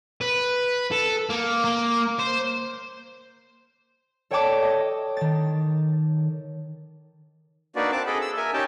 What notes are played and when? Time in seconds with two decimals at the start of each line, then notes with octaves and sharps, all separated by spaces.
0.21 B4
0.92 A4
1.30 A#3
1.64 A#3
2.19 C5
4.31 A4 C#5 D5 G5 A5 D6
4.63 D#5
5.17 D#3 A6
7.76 A#3 D4 D#4 F#4 B4 D5
7.92 C4 A5 D6
8.06 G#4 A4 D#5 B5
8.21 E6
8.37 A#4 E5 G#5
8.53 C#4 D#4 G4 G5 A5